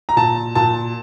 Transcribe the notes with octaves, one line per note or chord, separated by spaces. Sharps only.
A#5
A#2 A5
A#2 A5